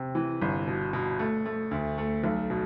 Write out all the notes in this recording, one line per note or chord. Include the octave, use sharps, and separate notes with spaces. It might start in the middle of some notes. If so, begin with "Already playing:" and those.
Already playing: C3
E3
G1
B2
B2
A3
A3
D2
A3
B1
B2